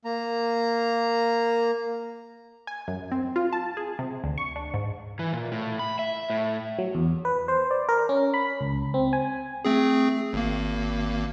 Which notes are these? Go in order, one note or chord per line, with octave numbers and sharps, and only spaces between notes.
A#3 A#5
G#5
F#2
C4
F4
A5
G#4
C3
D2
C#6
D4
G#2
E3
A#2
A2
B5
E5
A2
F#3
E2
B4
C5
D5
A#4
C#4
B5
C#2
C4
G#5
A3 C4 G#4
G#1 A#3